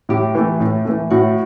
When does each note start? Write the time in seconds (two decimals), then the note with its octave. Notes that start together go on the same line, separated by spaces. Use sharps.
0.09 A2 G4
0.35 E3 A3
0.60 A2
0.85 E3 A3
1.10 A2 F#4